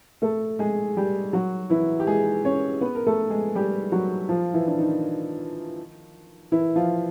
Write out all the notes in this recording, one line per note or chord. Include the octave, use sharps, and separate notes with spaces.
A3 A4
G#3 G#4
G3 G4
F#3 F#4
E3 E4
G4
G#3 G#4
C#4 C#5
B3 B4
A#4
A3 A4
G#3 G#4
G3 G4
F#3 F#4
F3 F4
E3 E4
D4
D#3 D#4
E3 E4
F3 F4